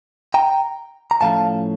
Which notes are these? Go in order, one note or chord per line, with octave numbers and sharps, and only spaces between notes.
G5 A#5
A#5
A2 F3 A3 C#4 F5 A5